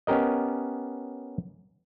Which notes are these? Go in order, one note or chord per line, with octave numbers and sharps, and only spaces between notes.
B3 C#4 G4 A#4 D#5